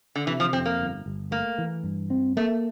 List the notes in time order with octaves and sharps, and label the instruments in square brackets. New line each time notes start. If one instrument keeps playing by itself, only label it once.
[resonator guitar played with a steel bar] D3
[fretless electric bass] C3 [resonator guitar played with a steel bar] E3
[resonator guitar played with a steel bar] F3
[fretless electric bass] F2 [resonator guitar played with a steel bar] C4
[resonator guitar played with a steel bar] A#3
[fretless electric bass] G1
G1
[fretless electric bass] A3 [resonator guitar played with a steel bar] A#3
[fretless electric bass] E3
G2
C4
[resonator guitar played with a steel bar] A3 [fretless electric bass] A#3